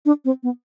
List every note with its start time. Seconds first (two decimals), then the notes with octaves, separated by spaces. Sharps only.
0.06 D4
0.25 C4
0.43 B3